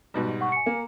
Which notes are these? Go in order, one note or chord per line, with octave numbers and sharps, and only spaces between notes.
G#2 B2 G3
F#5 C#6
G#5 C#7
A#3